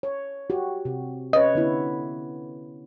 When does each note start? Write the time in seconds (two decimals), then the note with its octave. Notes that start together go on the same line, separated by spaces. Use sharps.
0.03 C#5
0.50 F#4 G4
0.85 C3
1.33 C#4 B4 C#5 D#5
1.55 D3 B3 E4